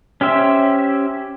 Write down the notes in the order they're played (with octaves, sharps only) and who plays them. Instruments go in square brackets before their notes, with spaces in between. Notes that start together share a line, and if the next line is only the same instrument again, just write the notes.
[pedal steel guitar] C#4 G4 C5 E5